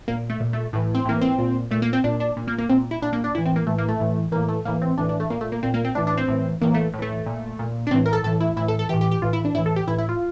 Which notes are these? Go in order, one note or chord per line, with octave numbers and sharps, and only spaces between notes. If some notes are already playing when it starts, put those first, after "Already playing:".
A#2 A#3
A3
A#2
A3
A2 E3
C4
A2 E3 A#3
C4
A#2
A#2 A3
A#3
C4
A#2 D4
D4
A#2
A#3
A#3
A#2 C4
E4
A#2 D4
A#3
D4
A2 E3 E4
C4
A#3
A2 E3 A3
A#3
A3
A2 E3
A2 E3 A#3
A3
A2 E3 A#3
C4
A2 E3 D4
D4
A3
A#2 A#3
A3
A#3
A#2 C4
A#3
C4
A2 E3 D4
D4
C4
A2 E3
A2 E3 A#3
A3
A2
E3 A3
A#2
A#2
D4
A2 E3 C4
A#4
A4
A2 E3 A4
E4
A2 E3 E4
A4
A4
A2 E3 G4
G4
G4
A2 E3 F4
E4
D4
A2 E3 E4
A4
G4
A2 E3 E4
E4
F4